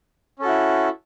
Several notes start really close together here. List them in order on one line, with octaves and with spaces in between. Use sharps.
C#4 A4 F#4 E4